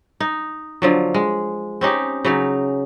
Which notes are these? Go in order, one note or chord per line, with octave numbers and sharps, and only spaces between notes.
D#4
D3 F3 F#3
G#3
C4 C#4 D#4 G4
C#3 F#3 D#4